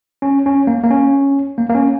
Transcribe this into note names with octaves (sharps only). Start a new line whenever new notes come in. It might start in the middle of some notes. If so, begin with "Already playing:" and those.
C#4
C#4
A#3
A#3
C#4
A#3
A#3
C#4